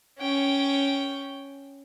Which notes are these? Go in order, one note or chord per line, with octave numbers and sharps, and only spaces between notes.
C#4 G5